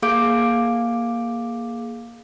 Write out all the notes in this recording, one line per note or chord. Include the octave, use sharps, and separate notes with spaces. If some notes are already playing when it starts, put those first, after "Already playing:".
A#3 G#4 F5 D6 G6 D7